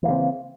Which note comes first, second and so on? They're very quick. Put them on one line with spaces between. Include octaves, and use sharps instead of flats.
E3 A#3 C#3 C4